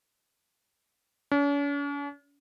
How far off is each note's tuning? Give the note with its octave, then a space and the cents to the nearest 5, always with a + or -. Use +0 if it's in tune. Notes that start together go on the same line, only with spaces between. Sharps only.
C#4 +45